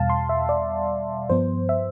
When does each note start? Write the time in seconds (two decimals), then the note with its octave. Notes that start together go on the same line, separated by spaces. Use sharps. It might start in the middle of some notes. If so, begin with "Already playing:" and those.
Already playing: E2 B2 G3 F5 A5
0.10 C6
0.29 E5
0.49 D5
1.30 G2 F3 B3 C5
1.69 E5